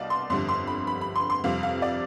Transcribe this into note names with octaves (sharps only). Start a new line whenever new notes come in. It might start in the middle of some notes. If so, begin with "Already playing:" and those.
Already playing: C2 B2 D5 D#5 F5
C6
G1 F2 D3 G3 C6
C6
B5
B5
B5
C6
C6
F2 C3 G3 F5
F5
D5